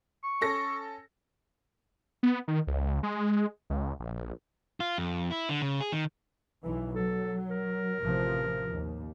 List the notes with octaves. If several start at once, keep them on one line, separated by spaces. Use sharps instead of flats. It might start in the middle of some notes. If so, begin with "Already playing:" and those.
C#6
C#4 A4 A#6
B3
D#3
C#2
G#3
C#2
A#1
F4
F2
E4
D3
C#3
G#4
D#3
B1 E3
F#3 A4
A#4
A1 C3 F3
D#2